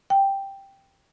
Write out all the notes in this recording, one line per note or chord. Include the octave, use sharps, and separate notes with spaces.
G5